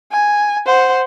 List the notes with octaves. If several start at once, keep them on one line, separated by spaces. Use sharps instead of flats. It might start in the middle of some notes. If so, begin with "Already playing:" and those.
G#5
C5 F#5